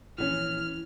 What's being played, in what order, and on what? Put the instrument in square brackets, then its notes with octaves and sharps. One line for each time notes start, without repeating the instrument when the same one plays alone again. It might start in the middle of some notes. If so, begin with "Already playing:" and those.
[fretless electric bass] A#1 D3 C#4 [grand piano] E3 [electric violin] F6